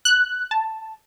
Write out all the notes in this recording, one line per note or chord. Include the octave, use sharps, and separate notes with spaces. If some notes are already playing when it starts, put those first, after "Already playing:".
F#6
A5